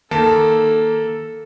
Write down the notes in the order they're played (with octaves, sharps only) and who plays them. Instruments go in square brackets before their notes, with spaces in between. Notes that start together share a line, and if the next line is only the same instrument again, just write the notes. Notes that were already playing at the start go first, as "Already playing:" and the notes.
[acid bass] D#3 [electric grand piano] A#3 [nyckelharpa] A4 [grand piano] A5